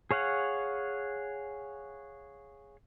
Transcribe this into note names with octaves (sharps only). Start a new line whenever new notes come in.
G#4 C#5 F5 F#5